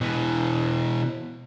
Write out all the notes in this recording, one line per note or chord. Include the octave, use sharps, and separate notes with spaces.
B2 E3